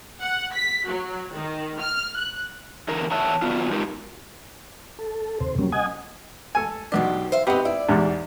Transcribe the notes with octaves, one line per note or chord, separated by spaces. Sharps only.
F#5
B6
F#3
D#3
F6
F#6
E2 D3 A#4
E2 C#5 E5 F#5 A5
D#3 F#3 B3 F4
G#3 D#4 F4 G4 A#4
A4
D#2 C3 C5
F#3 G3 A#3 C#4
D#5 F#5 G#5 D#6 G#6
A4 G#5
B1 F#2 B2 D4 G4
C5 E5 F5
C4 D#4 G4 B4 F#5
E4 D5
E2 G#2 G3